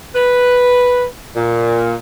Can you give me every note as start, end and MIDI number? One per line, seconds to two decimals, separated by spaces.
0.15 1.05 71
1.36 1.96 46